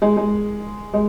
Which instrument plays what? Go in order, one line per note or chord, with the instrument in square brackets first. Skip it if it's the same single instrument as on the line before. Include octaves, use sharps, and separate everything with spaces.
[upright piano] G#3
G#3
G#3